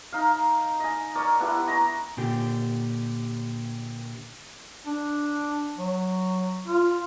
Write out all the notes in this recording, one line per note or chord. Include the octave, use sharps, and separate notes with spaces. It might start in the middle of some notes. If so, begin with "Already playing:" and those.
D#4 F5
D#5 G#5
A#4 C#5 D5
B3 D4 E4 G4
D#5 A#5 C#6
A#2 D3 G4
D4
F#3
F4